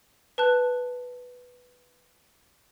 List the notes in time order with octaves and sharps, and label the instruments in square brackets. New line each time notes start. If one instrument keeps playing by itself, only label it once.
[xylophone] B4 A5 F#6